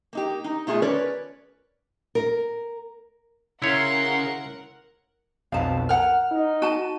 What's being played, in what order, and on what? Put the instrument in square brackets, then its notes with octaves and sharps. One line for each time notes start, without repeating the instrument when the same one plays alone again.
[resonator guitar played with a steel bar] A#3 D#4 G4
D#4
B2 A3 F4 G#4 A5
C#4 A#4 B4 C#5 D5
[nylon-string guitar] A#4
[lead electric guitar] C#3 [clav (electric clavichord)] E4 C#5 [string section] A#4 F#5 [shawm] C6
[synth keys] B1 F2 B2 [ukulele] F5 A5
[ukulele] A#4 F#5 [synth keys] F6
[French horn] D#4
[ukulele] F#4 A5 [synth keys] D#7